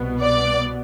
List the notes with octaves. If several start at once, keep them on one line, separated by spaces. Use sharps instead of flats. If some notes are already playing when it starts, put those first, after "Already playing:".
Already playing: C2 B2 B3
D5